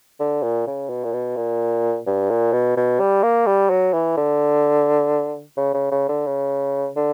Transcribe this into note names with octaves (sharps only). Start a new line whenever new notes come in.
D3
A#2
C#3
B2
A#2
B2
A#2
G2
A#2
B2
B2
G3
A#3
G3
F#3
E3
D3
C#3
C#3
C#3
D3
C#3
D3